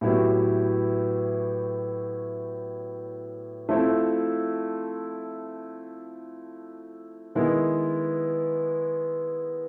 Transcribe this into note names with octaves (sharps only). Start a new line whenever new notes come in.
A2 F#3 B3 E4 G4
F3 A3 C4 E4 A4
D#3 G#3 B3 E4